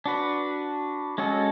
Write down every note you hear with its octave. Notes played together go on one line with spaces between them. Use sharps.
D4 F#4 B4
G#3 C#4 F#4 A4